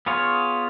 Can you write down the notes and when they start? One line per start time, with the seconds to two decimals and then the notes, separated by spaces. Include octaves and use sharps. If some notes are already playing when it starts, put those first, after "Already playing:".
0.06 B3 F4 G#4 C#5